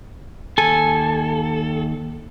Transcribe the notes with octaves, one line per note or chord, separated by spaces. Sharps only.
D#2 A4 G#5